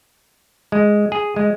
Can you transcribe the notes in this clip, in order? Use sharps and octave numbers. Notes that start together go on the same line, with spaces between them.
G#3
G#4
G#3